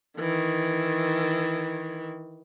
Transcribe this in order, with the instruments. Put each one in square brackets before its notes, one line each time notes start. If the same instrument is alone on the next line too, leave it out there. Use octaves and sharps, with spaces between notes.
[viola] D#3 E3